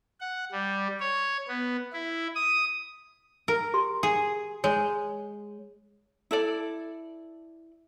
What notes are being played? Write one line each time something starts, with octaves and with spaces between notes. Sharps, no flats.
F#5
G3
C#5
B3
E4
D#6
A#4
G4 C6
G#4
G#3 C#5
E4 A4 D5